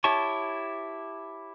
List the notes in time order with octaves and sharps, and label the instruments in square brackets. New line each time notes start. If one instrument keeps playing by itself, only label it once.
[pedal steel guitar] E4 G4 C#5 A5 C#6